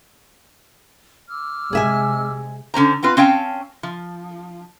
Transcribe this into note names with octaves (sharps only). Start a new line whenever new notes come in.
D6 E6 F6
C3 G#3 G#4 E5 G#5
D3 C#4 C5 A#5
B3 C4 F4 B4
C4 C#4 F5 G5 A5
F3